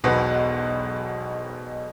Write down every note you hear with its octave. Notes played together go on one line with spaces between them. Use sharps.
E1 B1 B2 F#4 B4 C5